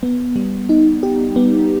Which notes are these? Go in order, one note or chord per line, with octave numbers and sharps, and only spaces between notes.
B3
G3
D#4
G4
B3